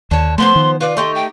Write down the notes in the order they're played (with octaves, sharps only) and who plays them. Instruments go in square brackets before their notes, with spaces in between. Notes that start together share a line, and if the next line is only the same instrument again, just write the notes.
[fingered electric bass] D#2 [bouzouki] D3 C#5 [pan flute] A5
[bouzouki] F3 B3 C5 [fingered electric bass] A3 [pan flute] C6
[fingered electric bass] D#3
[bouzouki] F4 D5 [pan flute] B4
[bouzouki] A3 D#4 G4 [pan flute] C6
[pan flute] G5